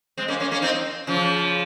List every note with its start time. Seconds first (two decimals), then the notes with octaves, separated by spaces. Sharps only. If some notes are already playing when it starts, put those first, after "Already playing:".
0.17 G#3 C4
0.28 A#3 C#4
0.40 A#3 C#4
0.51 A#3 C#4
0.62 C4 D#4
1.07 C#3 F3